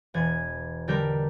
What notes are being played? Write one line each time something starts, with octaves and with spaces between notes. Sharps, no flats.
E1 G#6
D3 G3 G4 A#4 G6